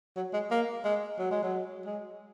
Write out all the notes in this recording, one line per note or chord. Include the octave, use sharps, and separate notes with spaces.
F#3
G#3
A#3
G#3
F#3
G#3
F#3
G#3